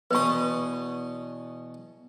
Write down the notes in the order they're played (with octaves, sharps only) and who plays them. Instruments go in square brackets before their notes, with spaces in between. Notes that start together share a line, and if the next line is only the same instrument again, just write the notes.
[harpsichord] E2 B2 D#6 [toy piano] B4 C#6